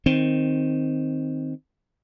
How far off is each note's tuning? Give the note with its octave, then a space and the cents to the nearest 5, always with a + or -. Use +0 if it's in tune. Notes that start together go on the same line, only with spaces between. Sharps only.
D#3 +0 C4 +0